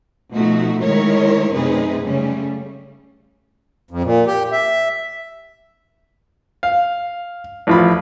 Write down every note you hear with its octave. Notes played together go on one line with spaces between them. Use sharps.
B2 F3 A3 D#4 F#4
D#3 G#3 A3 E4 A#4 C#5
F#2 C3 A3 D#4 G#4 B4
C#3 G3 A3 C#4
F2
A#2
G4
E5
F5
A1 F3 B5